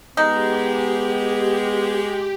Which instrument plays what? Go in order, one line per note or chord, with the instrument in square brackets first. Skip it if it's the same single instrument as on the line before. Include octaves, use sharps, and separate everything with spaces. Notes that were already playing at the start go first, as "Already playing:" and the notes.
[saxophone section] G#3 [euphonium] B3 [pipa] D#4 [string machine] G4